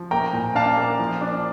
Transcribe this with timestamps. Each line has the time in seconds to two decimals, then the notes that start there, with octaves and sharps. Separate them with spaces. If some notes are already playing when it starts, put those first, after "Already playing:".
Already playing: F3
0.11 A#3 G5 A#5
0.33 A#2
0.55 D4 F5 A5
0.77 A#3
0.99 F3
1.21 D4